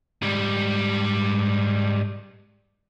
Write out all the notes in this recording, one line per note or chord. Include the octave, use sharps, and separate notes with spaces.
G#2 G3